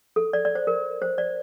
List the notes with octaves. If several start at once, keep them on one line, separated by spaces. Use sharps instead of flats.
A4
D5
D5
C5
A#4
C5
D5